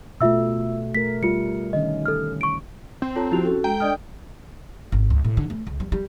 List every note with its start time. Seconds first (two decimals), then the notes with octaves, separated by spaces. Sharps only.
0.21 B2 A3 F4 E5 E6
0.95 A3 A#4 B6
1.23 G3 F4 C#7
1.73 D3 D#3 C#4 D#5
2.06 A4 F6
2.41 C#6 D7
3.02 C4
3.16 F4 A4 C#5 A5 A#5
3.32 F3 E4 F#4 G4 F7
3.45 C#4 F#4 A4
3.64 G#3 G5 A#5
3.80 D4 D5 D#5 D#6 F6
4.92 G#1
5.10 C#2
5.24 A2
5.37 D3
5.50 A3
5.67 C#2
5.80 G3
5.92 G3